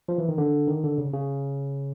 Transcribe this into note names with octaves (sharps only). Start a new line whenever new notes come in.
F3
E3
D#3
D3
D#3
D3
C#3
C#3